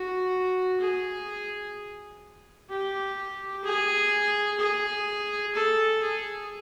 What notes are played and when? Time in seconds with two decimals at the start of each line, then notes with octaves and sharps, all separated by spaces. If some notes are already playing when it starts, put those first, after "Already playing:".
Already playing: F#4
0.80 G#4
2.69 G4
3.64 G#4
4.60 G#4
5.55 A4
6.02 G#4